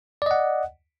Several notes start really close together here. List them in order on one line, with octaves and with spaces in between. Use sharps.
D5 D#5 F#5